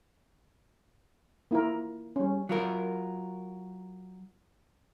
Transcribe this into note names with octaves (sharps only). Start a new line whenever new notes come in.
A#3 E4 F4 A#4
G3 C#4
F#3 F4 A#4